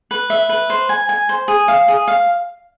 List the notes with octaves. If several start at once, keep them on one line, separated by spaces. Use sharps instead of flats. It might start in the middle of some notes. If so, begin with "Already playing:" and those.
B4
E5
B4
C5
G#5
G#5
C5
G#4
F5
G#4
F5